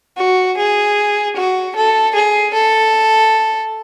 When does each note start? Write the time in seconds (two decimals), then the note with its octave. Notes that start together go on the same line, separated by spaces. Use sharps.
0.17 F#4
0.57 G#4
1.36 F#4
1.75 A4
2.14 G#4
2.54 A4